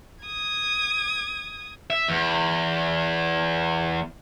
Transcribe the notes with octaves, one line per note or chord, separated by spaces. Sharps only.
D#6 G#6
E5
E2